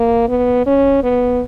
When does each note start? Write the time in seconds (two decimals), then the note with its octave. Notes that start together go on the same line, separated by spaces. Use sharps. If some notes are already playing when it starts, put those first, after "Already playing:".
Already playing: A#3
0.28 B3
0.66 C#4
1.03 B3